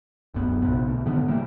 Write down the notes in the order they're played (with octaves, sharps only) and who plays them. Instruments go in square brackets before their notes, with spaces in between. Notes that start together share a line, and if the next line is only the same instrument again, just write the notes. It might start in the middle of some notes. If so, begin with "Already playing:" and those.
[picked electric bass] D1 A1 F#2 B3
A#1 C3 B3
D2 B2
G#2 D3 D#3 B3
C3 E3 G3 A#3